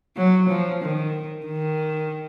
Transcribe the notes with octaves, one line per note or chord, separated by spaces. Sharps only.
F#3
F3
D#3
D#3